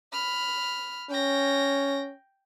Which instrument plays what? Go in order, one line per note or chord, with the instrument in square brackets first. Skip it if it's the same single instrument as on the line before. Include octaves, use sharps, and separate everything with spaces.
[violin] B5 F6
[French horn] C#4 [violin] G5 A#6